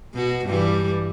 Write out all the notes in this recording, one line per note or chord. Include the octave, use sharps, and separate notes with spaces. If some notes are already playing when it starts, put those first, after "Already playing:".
B2 F#4
G2 E3 G3